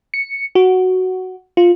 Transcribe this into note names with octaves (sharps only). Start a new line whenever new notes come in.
C#7
F#4
F4